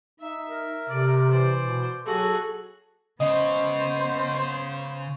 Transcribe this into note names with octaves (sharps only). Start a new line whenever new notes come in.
D#4 E5
A#4
C3 A4 D5
E3 C5 D5
B2
F#3 F#4 G#4 A4
C#3 B3 C5 D#5